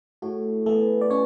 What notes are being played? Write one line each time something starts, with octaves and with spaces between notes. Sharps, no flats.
A2 F#4
E3 A3 B3 A4
D5
B2 C#4 C#5